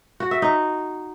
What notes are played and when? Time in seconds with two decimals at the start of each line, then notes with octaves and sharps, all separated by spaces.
0.20 F#4
0.31 E5
0.42 D#4